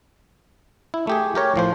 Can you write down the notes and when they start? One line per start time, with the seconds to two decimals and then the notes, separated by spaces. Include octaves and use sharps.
0.94 E4
1.07 A3 G4 G#4
1.35 G4 A#4 C#5
1.56 A2 F3 C5